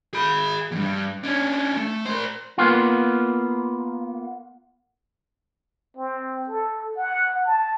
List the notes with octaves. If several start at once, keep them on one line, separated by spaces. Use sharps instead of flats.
G#4 B5
E2 G2
C#4 D4
A3
A#4 C5
A#3 B3 F4
C4
A4
F#5
A5